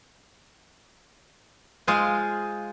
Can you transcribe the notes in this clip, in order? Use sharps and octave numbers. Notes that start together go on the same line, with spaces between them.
G#3 F4 G#4 C5